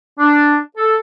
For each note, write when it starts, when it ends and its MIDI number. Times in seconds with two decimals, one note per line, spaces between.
0.19 0.56 62
0.77 0.95 69